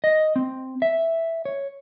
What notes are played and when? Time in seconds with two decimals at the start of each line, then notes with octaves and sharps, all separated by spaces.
0.04 D#5
0.36 C4
0.82 E5
1.45 C#5